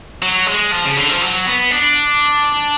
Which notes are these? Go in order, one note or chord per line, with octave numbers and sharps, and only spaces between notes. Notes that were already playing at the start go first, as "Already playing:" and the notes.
F#3
G#3
F3
C#3
D3
F3
F#3
B3
D4